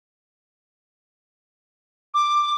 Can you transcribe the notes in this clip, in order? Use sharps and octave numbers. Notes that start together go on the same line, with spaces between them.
D6